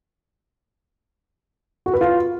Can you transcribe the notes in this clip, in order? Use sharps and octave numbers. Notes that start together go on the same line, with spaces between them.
F#4
B4
F4